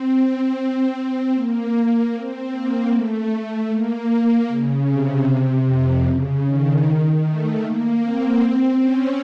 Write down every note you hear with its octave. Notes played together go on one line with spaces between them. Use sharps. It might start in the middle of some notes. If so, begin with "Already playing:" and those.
Already playing: C4
C4
A#3
A#3
C4
A#3
A3
A#3
A#3
C#3
C3
F2
C#3
D#3
A3
A#3
C4
C4
C#4